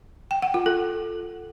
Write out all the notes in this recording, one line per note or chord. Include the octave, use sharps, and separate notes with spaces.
G5
F#5
F4
A4